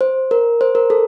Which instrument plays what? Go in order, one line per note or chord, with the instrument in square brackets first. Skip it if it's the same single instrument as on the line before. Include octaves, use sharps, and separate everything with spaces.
[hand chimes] C5
A#4
C5
A#4
A4